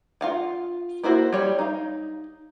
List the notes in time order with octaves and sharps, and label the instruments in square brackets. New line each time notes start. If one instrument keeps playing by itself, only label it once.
[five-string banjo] F4 F5 F#5
A#3 E4 F#4 C5
G3 C#5
D#4 F5